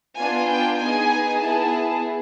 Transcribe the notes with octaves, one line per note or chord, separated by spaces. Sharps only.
B3 D4 F4 G#5
G5
B3 D#4 G#4 G#5
B3 E4 G#4 A5